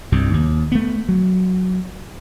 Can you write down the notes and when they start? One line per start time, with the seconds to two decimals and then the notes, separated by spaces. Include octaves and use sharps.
0.12 C2 G2
0.33 D#2
0.72 A3 B3
1.09 F#3